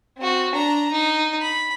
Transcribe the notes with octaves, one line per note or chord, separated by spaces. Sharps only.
C4 F#4
D4 A#5
D#4
B5